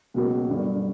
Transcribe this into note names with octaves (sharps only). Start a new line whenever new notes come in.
C#2 B2 F#3 A#3
G1 G2 D3